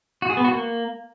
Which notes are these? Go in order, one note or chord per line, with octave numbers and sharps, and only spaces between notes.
F#4
G#4
B3
F#4
A#3